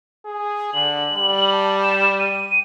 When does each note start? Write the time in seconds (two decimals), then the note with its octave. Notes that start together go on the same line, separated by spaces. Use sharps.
0.25 G#4
0.74 D3 F#7
1.13 G3
1.52 A5
1.83 E7
2.19 D#7